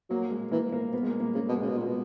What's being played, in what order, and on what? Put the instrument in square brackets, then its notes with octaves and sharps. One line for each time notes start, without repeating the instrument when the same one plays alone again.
[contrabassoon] F#3 [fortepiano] A#3
[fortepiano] G#3
[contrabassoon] E3 [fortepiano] A#3
[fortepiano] A#3
B3
G#3
A#3
A#3
[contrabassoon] C#3 [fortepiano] A#3
[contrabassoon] B2
[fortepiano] G#3
[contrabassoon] C#3
B2
A#2
B2